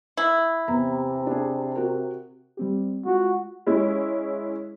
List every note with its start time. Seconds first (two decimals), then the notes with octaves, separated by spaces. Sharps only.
0.17 E4
0.68 E2 C3 A#5
1.27 D4 G#4
1.76 F#4 A#4
2.57 G3 C4 G4
3.05 G#3 F4 F#4
3.67 G#3 C#4 E4